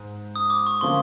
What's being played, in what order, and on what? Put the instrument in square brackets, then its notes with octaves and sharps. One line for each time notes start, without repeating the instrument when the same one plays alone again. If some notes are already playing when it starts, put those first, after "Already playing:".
Already playing: [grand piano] G#2
[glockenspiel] D#6
D6
C#6
[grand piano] D3 F3 A#3 C#4 [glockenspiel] C6